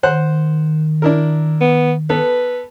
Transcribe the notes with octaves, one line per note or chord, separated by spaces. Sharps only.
D#3 C5 F#5 F#6
D4 E4 A#4
B3
B3 A4 B4